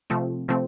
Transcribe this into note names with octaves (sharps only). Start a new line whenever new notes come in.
C3 F3 A3 C4
C3 F3 A3 C4